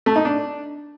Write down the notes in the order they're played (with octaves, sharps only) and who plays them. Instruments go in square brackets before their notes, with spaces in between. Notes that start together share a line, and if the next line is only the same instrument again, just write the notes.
[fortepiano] A3
D#4
D4